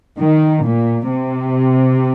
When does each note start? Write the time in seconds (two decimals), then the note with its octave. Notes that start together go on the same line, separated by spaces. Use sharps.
0.18 D#3
0.64 A#2
1.08 C3